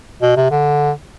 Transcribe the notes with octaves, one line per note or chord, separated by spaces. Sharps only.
B2
C3
D3